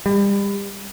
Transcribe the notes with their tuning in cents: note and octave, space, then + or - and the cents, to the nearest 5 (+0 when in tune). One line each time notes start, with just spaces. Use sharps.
G3 +35